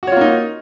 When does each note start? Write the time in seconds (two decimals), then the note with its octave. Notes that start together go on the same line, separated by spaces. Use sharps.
0.03 F#4
0.07 C#5
0.12 F4
0.17 A#3
0.21 D#4